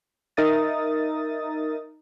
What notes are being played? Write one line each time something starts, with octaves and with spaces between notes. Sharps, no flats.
D#4 A#4 E5 D#6 A6